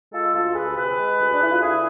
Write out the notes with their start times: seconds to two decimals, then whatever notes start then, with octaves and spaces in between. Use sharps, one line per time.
0.12 G#3 F4 A4
0.33 D2 F4 A4
0.55 D2 G#4 B4
0.76 C3 G#4 B4
0.97 G#3
1.19 D2
1.32 D4
1.40 D2 E4
1.52 F4
1.61 D3 E4 G#4